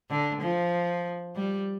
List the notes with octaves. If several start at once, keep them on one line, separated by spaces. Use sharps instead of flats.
D3
F3
G3